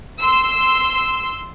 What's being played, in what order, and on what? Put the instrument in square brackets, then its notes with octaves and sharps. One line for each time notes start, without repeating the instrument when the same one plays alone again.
[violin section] C6 E6